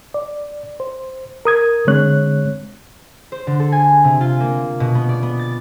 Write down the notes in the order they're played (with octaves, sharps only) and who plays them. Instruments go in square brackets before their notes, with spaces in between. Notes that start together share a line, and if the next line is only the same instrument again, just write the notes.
[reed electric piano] D5
C5
A#4 D#6 G#6
D3 G#3 C4 C#5 F#6
[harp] C5
D3
A4
G#5
C3
F4
A#3
B2
B3
D5
B3
A6